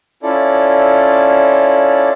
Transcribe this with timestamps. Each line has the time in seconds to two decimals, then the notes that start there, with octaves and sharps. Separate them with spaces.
0.23 C#4 E4 F4 A4 D5